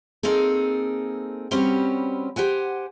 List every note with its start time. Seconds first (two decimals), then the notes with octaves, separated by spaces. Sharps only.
0.23 A#3 C4 D#4 G#4 A4
1.51 G3 C4 C#4 F#4 G4 B4
2.36 G4 C5 F#5 G#5